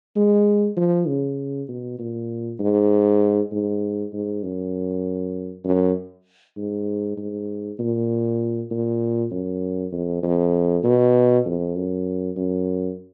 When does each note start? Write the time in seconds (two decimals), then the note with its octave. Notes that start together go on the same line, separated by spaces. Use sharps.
0.16 G#3
0.77 F3
1.08 C#3
1.68 B2
1.99 A#2
2.60 G#2
3.52 G#2
4.13 G#2
4.43 F#2
5.65 F#2
6.57 G#2
7.17 G#2
7.80 A#2
8.71 A#2
9.31 F#2
9.92 F2
10.23 F2
10.84 B2
11.46 F2
11.76 F#2
12.37 F#2